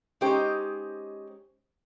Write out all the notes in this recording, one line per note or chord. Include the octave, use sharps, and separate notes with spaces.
G#3 C#4 D#4 G4 C5